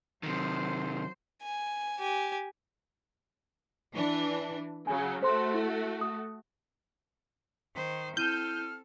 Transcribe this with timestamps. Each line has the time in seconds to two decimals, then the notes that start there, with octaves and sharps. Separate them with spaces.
0.23 C3 D#3 F#3 C5
1.42 G#5
1.99 G4 G#5
3.93 E3 D4
4.87 C#3 F#3 G#5
5.23 A3 F#4 C5 C6
5.54 E4
6.01 D#6
7.75 D#3 C5
8.17 C4 E4 A4 F6 G6 D#7 E7